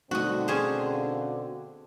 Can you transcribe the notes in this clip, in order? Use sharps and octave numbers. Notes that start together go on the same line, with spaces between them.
B2 D3 G3 A3 C4 D#4 F#4 D#5
C#4 G#4 C5
D4 F5